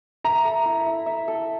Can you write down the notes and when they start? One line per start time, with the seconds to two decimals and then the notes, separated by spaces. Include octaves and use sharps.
0.24 E5 A#5
0.45 A4
0.65 E4
0.86 E4
1.06 E5
1.28 A4